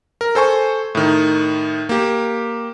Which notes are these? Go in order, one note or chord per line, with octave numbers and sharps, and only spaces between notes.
A#4
A4 C5 G#5 C#6
A2 D#3
A#3 G4